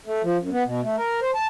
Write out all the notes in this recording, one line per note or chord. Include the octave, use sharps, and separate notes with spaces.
A3
F3
F#2
B3
B2
A3
A#4
C5
A5